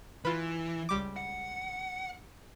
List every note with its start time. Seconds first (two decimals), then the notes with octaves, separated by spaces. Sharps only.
0.25 E3 F4 B4
0.89 C#2 G3 D6
1.16 F#5